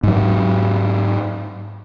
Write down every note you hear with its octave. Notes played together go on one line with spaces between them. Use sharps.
G#2 F#3